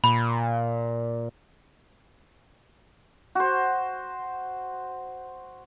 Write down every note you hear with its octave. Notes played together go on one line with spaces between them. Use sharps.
A#2 B5
F#4 C5